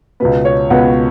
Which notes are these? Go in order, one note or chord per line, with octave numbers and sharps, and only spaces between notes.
C#2 B2 B3 B4
C#5
C#2 B2 B3 F#5